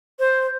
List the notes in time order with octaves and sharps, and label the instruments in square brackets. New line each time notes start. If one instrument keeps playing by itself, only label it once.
[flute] C5